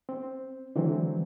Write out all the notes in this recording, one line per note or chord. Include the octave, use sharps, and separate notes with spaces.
C4
D3 E3 F#3 G#3 C4